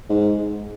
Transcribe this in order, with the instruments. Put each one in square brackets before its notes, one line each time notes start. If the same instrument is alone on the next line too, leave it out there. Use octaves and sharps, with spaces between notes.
[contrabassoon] G#2